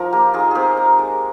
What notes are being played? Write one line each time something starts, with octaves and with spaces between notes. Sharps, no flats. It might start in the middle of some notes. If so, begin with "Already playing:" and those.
Already playing: F3 D#4 A#4 D5
A#3 G4
D#4 F4 G#4
C4 G4 G#4 A#4
D#4
G#3